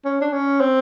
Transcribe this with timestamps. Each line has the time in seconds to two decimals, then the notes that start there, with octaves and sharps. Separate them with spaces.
0.05 C#4
0.21 D4
0.33 C#4
0.61 C4